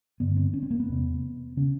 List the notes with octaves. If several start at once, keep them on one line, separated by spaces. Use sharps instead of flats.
G2 D3 B3
C4
C#4
C4
A#3
B3
E2 C3
C#3 C#4